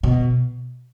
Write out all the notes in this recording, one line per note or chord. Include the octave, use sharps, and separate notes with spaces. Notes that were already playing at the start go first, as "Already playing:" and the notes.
B2